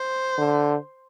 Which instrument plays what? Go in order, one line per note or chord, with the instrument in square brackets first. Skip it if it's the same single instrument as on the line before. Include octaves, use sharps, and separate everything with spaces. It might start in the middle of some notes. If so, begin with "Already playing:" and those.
Already playing: [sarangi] C5
[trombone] D3